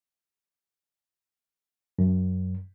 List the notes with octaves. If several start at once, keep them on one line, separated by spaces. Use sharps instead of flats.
F#2